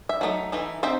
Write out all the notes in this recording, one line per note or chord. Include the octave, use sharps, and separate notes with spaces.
E5
F#3 A3 D#4
E3 A3 D#4
C4 D#4 C5 E5